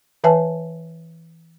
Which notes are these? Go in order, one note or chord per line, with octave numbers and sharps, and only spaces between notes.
E3 B4 E5 G#5 A5